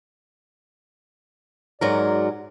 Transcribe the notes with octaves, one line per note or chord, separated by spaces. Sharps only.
G#2 F#3 A#4 D5